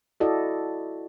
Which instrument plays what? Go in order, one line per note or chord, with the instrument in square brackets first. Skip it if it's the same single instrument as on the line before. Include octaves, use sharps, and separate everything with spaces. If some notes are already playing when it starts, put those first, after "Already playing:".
[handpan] E4 F#4 A4 D5 D#5